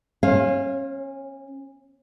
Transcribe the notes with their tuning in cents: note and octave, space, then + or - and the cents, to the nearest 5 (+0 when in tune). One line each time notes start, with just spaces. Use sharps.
C#4 -25 C5 +35 F5 +0